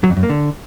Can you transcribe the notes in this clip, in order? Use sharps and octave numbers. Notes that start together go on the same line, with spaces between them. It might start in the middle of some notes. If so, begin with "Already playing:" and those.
F#3
F2
F#2
A#3
D3